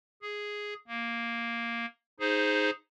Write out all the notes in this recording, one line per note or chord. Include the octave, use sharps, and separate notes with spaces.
G#4
A#3
D#4 G#4 C5